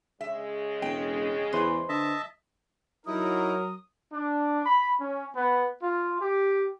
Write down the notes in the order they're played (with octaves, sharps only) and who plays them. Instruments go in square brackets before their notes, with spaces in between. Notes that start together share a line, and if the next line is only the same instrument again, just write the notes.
[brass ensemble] C#3 G#3 [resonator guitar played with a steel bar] E5
[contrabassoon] E1 [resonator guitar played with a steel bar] G5
[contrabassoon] E2 [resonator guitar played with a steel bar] B4 C5
[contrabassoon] D3 [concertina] D#5 E5 A5
[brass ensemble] F#3 A#4 [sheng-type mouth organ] D#4 E4 [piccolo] D#6
[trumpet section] D4
B5
C#4
B3
F4
G4